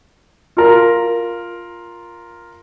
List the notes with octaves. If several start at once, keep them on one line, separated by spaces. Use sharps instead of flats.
F4 A#4